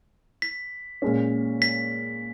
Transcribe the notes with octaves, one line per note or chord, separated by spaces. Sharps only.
B6
A#2 G#3 C#4
B6